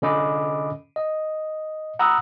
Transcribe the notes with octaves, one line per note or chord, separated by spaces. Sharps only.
D3 C#4 D#5 B5 D6
D#5
F#5 A#5 B5 D#6 E6 F#6